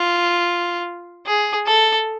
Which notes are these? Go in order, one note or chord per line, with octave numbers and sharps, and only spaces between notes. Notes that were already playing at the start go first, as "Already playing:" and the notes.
Already playing: F4
G#4
A4